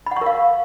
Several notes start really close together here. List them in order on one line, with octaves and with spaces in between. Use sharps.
B5 F#5 C#6 A#4 F5